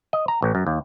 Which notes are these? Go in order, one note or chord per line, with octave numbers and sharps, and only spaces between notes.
D#5
A#5
A1
F#2
D#2